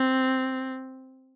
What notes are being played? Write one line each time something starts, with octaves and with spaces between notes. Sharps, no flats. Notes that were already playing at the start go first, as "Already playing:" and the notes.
Already playing: C4